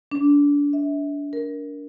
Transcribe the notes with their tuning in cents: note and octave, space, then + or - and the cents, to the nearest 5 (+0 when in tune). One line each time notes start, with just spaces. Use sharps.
D4 -30
E5 -30
A#4 +5